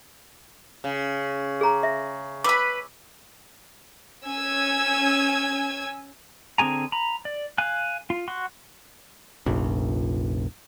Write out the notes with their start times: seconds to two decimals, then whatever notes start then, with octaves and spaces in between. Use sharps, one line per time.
0.84 C#3
1.61 G#4 A#5
1.83 E5
2.44 B4 B5 D6 E6
4.28 C#4 G#5 E6 G#6
6.58 D3 C4 G#4 G#5 A#5
6.92 A#5 B5
7.25 D5
7.58 F5 G#5 F#6
8.10 F4
8.28 F#4 F#5 C6
9.46 F1 A#1